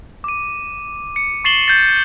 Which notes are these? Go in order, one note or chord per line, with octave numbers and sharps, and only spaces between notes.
D6 D#7
C#7
C#6 A6 C7 E7 F#7 G7
G6 A6